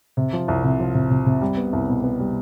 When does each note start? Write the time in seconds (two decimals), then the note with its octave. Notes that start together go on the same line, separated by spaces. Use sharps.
0.17 C3
0.33 F3
0.48 C2
0.64 C3
0.80 F3
0.95 C3
1.10 C3
1.26 C3
1.41 G3
1.57 B3
1.73 C2
1.89 B2
2.04 B3
2.20 G3